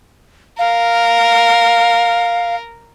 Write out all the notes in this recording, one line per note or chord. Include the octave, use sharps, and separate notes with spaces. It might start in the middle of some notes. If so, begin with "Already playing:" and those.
A#4 F5